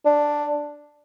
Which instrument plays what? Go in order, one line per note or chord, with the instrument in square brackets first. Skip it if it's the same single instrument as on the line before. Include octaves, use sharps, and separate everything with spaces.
[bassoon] D4